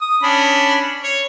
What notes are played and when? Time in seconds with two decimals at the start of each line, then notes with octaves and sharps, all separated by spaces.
0.01 D#6
0.23 C#4 D4 B5
1.03 C#5